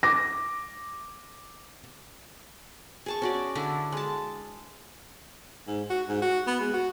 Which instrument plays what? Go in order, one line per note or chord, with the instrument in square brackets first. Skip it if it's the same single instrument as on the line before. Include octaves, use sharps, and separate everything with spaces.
[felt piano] D6 A#6
[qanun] G#4 A5 C#6
C#4 F#4 D5
D3 D4 E4
G#3 A5
[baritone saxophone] G#2
F#4
G#2
F#4
B3
G#3
F#4